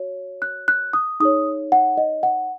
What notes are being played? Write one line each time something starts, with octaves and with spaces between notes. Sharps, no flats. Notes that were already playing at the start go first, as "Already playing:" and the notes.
Already playing: F#4 C#5
F#6
F#6
D#6
D#4 G#4 C#5 D#6
F#5
D#5
F#5